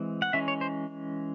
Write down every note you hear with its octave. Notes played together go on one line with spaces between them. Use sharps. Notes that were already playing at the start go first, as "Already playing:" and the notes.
Already playing: E3 G#3 C4
F#5
E3 G#3 C#4 E5
C#5
C5